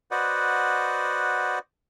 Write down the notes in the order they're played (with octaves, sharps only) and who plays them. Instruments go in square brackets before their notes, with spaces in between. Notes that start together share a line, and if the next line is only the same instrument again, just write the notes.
[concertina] F#4 B4 C5 D5 D#5 F#5